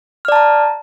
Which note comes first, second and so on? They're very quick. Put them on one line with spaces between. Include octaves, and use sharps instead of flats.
F6 D5 A5 A#5